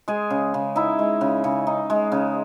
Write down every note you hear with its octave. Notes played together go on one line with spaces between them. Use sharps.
G#3 G#4 G#5
C#3
C#3
D#4 E4 E5
G#3
C#3
C#3
D#4
G#3
C#3